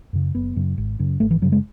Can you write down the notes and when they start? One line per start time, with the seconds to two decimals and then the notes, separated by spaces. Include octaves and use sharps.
0.13 F#2 C#3
0.35 F#1 B3
0.56 F#2 C#3
0.78 G#1
0.99 F#2 C#3
1.20 G#1 A3
1.31 E3
1.41 F#2 C#3 F#3
1.52 G#3